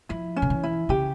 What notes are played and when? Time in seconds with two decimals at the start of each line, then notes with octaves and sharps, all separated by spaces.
0.09 F3 E4
0.36 C#4
0.42 C#3
0.50 E3
0.63 E4
0.89 C#3 G4